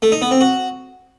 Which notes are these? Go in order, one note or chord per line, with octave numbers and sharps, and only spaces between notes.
A3
D#4
B3
C4
F#4